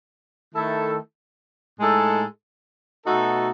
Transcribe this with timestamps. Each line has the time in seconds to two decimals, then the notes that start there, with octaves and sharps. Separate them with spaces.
0.52 D#3 A3 E4 A4
1.79 A2 G#3 D#4 A4
3.05 B2 A3 D#4 F#4 A4